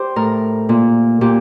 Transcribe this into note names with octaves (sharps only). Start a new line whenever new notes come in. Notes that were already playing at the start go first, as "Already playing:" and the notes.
Already playing: G4 C5
A2 A#4
A#2
A#2 G4